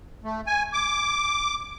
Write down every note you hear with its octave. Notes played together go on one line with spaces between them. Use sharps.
A3
G#5
D6